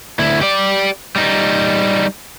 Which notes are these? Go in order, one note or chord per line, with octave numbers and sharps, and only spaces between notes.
D2 E4
G4 D5
G3 D#4